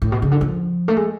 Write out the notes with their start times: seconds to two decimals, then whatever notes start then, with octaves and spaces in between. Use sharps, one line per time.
0.02 A2
0.12 B2
0.22 C#3
0.31 D3
0.41 F3
0.88 A3
0.97 G#3